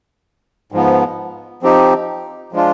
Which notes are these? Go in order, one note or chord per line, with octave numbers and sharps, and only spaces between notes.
G#2 F3 B3
F3 C4 D#4 G4
F3 G#3 D4 F4